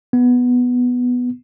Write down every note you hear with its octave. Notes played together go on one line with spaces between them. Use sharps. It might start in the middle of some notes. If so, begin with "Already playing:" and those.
B3